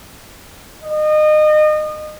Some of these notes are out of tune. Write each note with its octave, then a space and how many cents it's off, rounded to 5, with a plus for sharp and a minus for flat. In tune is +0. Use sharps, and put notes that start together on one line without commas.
D#5 -30